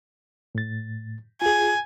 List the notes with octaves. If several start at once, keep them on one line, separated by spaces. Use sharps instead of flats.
A2 A6
F4 G#4 G#5